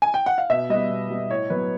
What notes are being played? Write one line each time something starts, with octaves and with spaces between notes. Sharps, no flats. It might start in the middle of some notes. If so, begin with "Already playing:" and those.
G#5
G5
F#5
F5
B2 E5
G3 B3 D#5
B2
G3 B3
A2 C#5
F#3 B3 B4